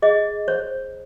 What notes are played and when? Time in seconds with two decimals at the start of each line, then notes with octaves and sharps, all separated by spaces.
0.02 G#4 D#5
0.48 C5 C#5